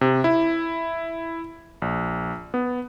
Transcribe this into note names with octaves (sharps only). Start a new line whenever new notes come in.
C3
E4
A#1
B3